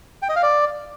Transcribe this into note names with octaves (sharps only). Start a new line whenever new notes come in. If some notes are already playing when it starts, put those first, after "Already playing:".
G5
D#5
F5
D5